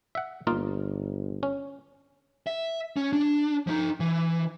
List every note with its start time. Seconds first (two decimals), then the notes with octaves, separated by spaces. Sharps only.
0.15 E5 F#5
0.47 G1 A#3 D#4 F4
1.43 C#4
2.47 E5
2.97 C#4
3.13 D4
3.67 F3 D#4
4.00 E3